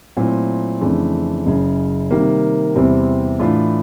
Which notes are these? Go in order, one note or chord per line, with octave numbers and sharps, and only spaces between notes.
A#2 F#3 A3 C4 E4
F2 C#3 E3 A3 D4
F#1 F#2 C#3
C3 D#3 G3 A#3
E2 C3 E3 G3 C4
A2 E3 A3 D4 F4